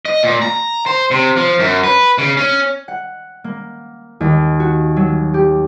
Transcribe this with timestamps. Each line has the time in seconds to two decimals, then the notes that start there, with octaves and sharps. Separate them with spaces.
0.06 D#5
0.23 A#2
0.42 A#5
0.86 C5
1.11 C3
1.36 F3
1.59 F#2
1.84 B4
2.18 C#3
2.37 C#4
2.88 F#5
3.44 A#3
4.21 D#2
4.60 F#4
4.96 F#3
5.34 G4